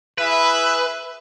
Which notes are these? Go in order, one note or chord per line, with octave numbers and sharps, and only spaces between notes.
E4 G#4 B4 E5